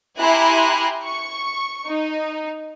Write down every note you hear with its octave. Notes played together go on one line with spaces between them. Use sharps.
E4 G4 G#5 A#5 C6 F#6
C#6
D#4